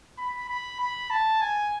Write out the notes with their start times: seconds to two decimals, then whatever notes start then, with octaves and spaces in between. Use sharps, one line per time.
0.18 B5
0.49 B5
0.80 B5
1.11 A5
1.41 G#5